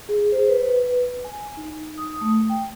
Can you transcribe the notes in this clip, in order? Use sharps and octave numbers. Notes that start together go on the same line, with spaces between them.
G#4
C5
B4
G#5
D#4
D#6
A3
G5